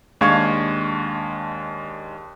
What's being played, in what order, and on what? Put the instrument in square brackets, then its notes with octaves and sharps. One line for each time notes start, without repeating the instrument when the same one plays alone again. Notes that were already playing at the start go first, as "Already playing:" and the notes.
[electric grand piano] D#2 G#3 D4 F5 C#6 G#6